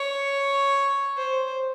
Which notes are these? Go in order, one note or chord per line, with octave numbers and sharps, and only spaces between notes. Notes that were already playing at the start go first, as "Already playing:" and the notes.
Already playing: C#5
C5